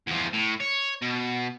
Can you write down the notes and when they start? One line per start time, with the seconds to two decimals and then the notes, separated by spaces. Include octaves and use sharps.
0.07 E2 F3
0.34 A2
0.61 C#5
1.02 B2